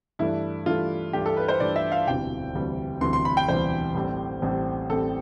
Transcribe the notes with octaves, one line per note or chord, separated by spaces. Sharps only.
G2 E3 A3 D4 E4
G2 E3 A3 D4 F4
G2 E3 A3 D4 G4
A4
B4
C5
G2 E3 A3 D4 D5
E5
F5
E1 D2 C3 E3 G3 G5
E1 D2 C3 E3 G3
E1 D2 C3 E3 G3 C6
C6
B5
G5
E1 D2 C3 E3 G3 C5
A1 A2 G3 C4
A1 A2 G3 C4
A1 A2 G3 C4 A4